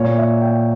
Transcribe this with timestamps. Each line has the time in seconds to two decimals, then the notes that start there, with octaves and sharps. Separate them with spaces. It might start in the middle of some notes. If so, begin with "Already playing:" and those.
Already playing: A#2 C#5
0.18 E5
0.42 G5